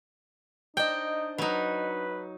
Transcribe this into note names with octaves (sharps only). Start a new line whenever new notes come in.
D4 D#4 C5 D#5 G5
F#3 D#4 B4